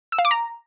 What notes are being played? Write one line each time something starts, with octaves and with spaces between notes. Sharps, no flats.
E6
F5
D6
A#5